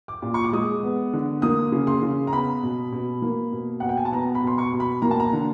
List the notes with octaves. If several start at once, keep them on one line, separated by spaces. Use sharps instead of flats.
D6
A#2
C#6
D6
G#3 D#6
B3
D3
A#3 D#6
C#3
C6
C#3
A#5
B3 B5
B2
B2
A#3
B2
B2 F#5
G5
G#5
A5
B3 A#5
B5
B2 C6
C#6
B2
B5
A#3 A#5
A5
A#5
D3